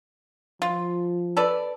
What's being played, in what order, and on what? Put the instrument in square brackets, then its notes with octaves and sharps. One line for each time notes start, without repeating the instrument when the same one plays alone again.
[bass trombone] F3 [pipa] F4
[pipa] A4 B4 D5